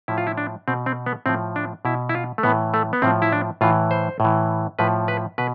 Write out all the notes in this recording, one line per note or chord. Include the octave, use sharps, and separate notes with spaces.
A2 F3 E4
F4
E4
D4
B2 C4
C4
B3
A2 F3 C4
D4
B2 E4
E4
F4
A3
A2 E3 B3
A3
B3
A2 F3 C4
E4
D4
A2 E3 F4
C5
A2 E3
A2 F3 B4
B4
B2 B4